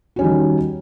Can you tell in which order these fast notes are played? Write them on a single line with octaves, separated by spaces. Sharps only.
F#4 C#4 G3 D#3